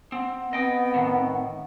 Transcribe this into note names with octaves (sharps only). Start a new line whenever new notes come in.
C4 F#5
B3 C4 D#5 G5
A2 D#3